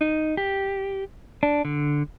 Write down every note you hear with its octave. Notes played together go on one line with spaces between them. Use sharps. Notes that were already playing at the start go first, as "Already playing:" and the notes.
D#4
G4
D4
D3